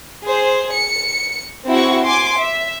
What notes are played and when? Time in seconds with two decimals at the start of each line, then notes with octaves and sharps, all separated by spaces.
0.23 G#4 C5
0.72 C#7
1.68 C4 E4 F#4 G#4 F#5 C#6
2.04 G#5 C6 D6
2.37 E5